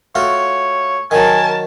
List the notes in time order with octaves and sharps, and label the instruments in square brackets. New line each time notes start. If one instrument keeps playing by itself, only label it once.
[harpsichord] A3 F4 F#4 [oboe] C#5
[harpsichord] D#3 F#3 [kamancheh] A#4 A5 [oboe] G#5